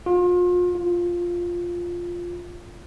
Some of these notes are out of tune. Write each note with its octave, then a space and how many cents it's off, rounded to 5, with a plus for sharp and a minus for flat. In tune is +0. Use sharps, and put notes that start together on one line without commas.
F4 +35
F4 +0